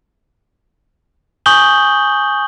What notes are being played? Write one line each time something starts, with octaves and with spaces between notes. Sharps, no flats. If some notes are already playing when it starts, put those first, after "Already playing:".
G#5 C#6 D#6 G6 F#7 G7